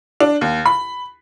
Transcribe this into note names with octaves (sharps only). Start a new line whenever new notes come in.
D4
D#2
B5